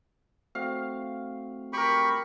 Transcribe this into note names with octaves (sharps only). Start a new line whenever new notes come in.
A3 C4 F#4 F5
G4 A#4 B5 C#6